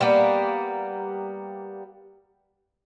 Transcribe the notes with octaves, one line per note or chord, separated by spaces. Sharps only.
G3 A#3 B3